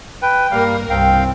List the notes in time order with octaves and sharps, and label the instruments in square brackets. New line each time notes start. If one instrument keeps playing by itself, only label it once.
[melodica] B4 [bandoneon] G5
[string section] G2 A#3 A#4 [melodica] G3 F5
[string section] C2 G2 [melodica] C4 [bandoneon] F5 G5